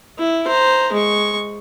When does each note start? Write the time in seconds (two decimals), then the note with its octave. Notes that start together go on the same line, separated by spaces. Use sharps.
0.19 E4
0.47 C5 A#5
0.93 G#3 C#6